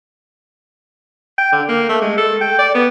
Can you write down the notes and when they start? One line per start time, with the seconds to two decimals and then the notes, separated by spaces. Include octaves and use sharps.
1.38 G5
1.52 D3
1.68 A#3
1.89 A3
2.01 G#3
2.17 A4
2.41 G5
2.59 D5
2.75 B3